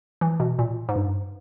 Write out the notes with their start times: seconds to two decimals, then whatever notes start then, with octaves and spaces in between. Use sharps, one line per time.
0.21 E3
0.40 B2
0.59 A#2
0.89 G#2
0.96 G2